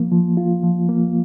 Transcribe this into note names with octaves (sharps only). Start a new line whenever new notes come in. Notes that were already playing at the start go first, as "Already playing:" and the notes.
Already playing: F3 A#3
F3
F4
F3
A#3